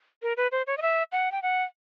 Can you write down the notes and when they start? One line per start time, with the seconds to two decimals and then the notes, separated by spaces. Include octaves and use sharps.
0.23 A#4
0.37 B4
0.52 C5
0.67 C#5
0.78 D#5
0.82 E5
1.12 F#5
1.32 G5
1.42 F#5